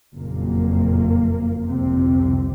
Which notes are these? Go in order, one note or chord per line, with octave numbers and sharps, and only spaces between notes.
F#1 F2 A#2 A#3
G1 C2 F2 C3 C4